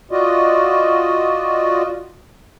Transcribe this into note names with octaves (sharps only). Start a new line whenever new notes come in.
F4 F#4 D5 D#5